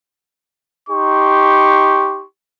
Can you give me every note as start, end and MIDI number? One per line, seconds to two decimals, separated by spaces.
0.88 2.24 63
0.88 2.24 67
0.88 2.24 84
0.88 2.24 85